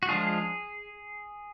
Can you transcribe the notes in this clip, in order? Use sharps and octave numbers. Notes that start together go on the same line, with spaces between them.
F#4
F3 G#3 D4 F4 G#4